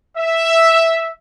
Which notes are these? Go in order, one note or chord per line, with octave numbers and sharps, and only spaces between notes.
E5